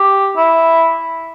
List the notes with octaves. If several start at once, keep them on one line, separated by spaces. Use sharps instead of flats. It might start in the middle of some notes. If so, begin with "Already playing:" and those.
Already playing: G4
E4